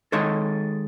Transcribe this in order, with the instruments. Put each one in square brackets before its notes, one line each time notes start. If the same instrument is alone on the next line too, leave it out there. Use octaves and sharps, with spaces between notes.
[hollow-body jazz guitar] D#3 G#3 D#4 A4 C#5